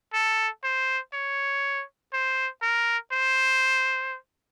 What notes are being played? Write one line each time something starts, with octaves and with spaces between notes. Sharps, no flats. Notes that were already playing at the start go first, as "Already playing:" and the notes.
A4
C5
C#5
C5
A#4
C5